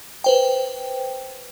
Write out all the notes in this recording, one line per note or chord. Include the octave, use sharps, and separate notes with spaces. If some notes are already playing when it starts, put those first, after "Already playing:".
B4 C5 G5